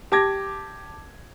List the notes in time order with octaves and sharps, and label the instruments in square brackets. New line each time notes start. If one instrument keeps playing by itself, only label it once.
[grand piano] G4 A5 D6 G#6 A#6